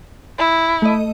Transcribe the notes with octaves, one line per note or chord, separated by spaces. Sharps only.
E4
A3 D#5